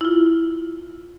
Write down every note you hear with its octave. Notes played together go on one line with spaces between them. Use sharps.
E4 F4